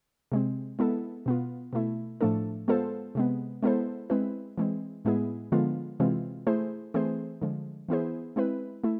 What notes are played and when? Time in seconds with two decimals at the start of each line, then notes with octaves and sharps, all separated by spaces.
0.32 C3 G#3 C4
0.79 G#3 B3 E4 A4
1.26 B2 B3 F4
1.73 B2 A3 E4
2.21 A2 F3 A3 D4 A4
2.68 G#3 B3 F4 A4 C5
3.15 C3 G#3 B3
3.63 G#3 B3 E4 A4 C5
4.10 G#3 C4 E4 B4
4.58 E3 G#3 C4
5.05 A2 G#3 B3 E4 G#4
5.52 D3 F3 G#3 B3 F4
6.00 C3 E3 G#3 C4 F4
6.47 A3 E4 G#4 C5
6.94 E3 A3 C4 G#4 C5
7.42 D3 F3 G#3
7.89 E3 B3 E4 G#4 C5
8.36 G#3 C4 E4 B4
8.84 A3 E4